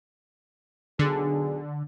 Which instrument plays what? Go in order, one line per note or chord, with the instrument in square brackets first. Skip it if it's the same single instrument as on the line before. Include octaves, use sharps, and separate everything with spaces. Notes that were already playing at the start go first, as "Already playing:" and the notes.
[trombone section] B1 G#4 [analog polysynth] D3